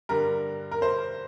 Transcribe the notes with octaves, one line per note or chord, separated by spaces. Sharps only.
G2 D3 G3 A#4
A#4
C5